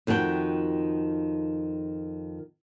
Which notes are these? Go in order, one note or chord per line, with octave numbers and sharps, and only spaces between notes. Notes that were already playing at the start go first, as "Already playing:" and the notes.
F2 D#3 F#4 G#4 G5